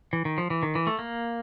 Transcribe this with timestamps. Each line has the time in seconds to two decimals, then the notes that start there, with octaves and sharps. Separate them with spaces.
0.13 E3
0.25 D#3
0.38 F3
0.50 E3
0.63 D#3
0.75 E3
0.87 A3
0.99 A#3